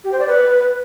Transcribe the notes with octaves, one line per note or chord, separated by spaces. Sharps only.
G4
C5
D5
B4